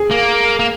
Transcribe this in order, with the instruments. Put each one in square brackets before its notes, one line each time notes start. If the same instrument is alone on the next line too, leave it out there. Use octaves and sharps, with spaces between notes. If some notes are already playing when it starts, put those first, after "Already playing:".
Already playing: [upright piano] G#4
[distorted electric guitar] A#3
A#3